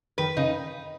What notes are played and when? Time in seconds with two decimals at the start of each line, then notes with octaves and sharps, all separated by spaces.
0.18 D#3 B4
0.37 C#3 D#4